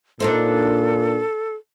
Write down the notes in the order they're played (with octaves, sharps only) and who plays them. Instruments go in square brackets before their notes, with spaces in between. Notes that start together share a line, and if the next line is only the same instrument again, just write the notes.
[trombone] A#2 [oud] D4 D#4 C5 [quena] A4